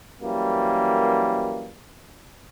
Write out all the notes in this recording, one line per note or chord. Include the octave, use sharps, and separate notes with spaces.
F#2 E3 G3 A#3